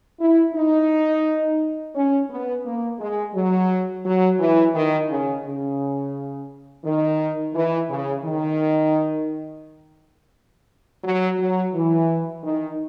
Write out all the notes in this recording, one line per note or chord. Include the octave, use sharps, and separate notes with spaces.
E4
D#4
C#4
B3
A#3
G#3
F#3
F#3
E3
D#3
C#3
C#3
D#3
E3
C#3
D#3
F#3
F#3
E3
D#3